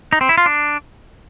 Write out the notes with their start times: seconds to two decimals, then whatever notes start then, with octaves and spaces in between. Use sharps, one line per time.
0.13 D#4
0.21 C4
0.29 E4
0.38 F4
0.46 D4